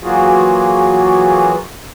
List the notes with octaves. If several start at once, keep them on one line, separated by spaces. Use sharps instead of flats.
E3 F#3 A#3 F4 F#4 G#4